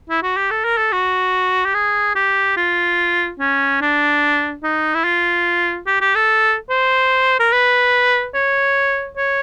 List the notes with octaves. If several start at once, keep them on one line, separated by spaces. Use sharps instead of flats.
E4
F#4
G4
A4
A#4
A4
F#4
G4
G#4
G4
F4
C#4
D4
D#4
E4
F4
G4
G4
A4
C5
A#4
B4
C#5
C#5